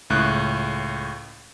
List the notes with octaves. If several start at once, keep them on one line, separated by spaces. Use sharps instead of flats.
C#2 A2 F#6